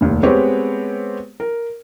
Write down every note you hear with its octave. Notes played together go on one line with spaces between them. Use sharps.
F1 D#2
G#3 B3 C4 G4 B4 C#5
A#4